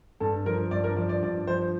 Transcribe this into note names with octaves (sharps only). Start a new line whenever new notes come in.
G2 A4
F3 A#4
G2 D5
A#4
F3 D5
D5
G2 D5
F3 C5